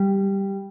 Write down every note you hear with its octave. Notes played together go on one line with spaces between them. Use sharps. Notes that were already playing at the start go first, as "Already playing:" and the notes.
Already playing: G3